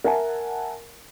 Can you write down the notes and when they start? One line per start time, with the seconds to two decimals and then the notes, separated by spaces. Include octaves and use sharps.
0.04 A#4 E5 F#5 G#5 A5